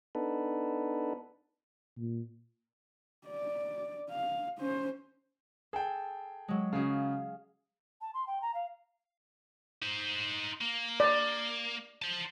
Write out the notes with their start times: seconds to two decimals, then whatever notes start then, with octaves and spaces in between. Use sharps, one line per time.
0.15 B3 D4 D#4 A4 B4
1.98 A#2
3.28 D5
4.10 F5
4.58 C#4 C5
5.73 G#4 A4 G5
6.48 F#3 G#3
6.73 C#3 F#3 C#4 G#4 F5
8.01 A5
8.14 C6
8.27 G5
8.42 A#5
8.54 F5
9.82 D#4 C5
10.61 A#3
11.00 D5
12.02 C5 A5